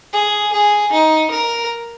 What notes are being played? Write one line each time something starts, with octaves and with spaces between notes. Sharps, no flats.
G#4
G#4
D#4
A#4